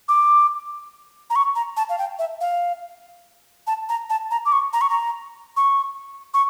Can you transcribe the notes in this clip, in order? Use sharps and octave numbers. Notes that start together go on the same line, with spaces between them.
D6
A#5
C#6
A#5
A5
F5
G5
E5
F5
A5
A#5
A5
A#5
D6
C#6
A#5
C#6
A#5
C#6
C#6